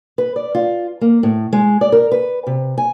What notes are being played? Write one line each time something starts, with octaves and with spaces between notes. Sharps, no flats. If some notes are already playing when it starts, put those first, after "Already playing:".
B4
D5
F4
A#3
A2
G#3
D5
A#4
B4
C3
G#5